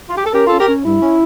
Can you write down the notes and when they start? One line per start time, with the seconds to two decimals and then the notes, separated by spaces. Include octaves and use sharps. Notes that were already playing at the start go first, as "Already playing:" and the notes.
0.08 F4
0.17 G4
0.25 A4
0.33 C#4 G4 A#4
0.47 C#4 F4 A4
0.59 G4 A#4
0.68 C#4
0.85 G2 E4
1.02 C#4